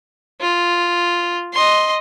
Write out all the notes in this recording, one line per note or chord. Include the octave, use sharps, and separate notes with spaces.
F4
D#5 C6